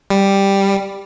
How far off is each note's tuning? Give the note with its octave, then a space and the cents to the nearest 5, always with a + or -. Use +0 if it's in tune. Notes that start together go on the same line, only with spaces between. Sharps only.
G3 +5